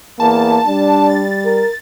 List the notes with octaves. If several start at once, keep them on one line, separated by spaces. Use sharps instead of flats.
E2 A#3 A5
G3 D4
A6
A#4